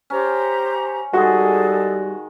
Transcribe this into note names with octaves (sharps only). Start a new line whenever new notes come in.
C#4 G4 C5 A#5
D#3 G3 G#3 F#4 G#4 A4 C6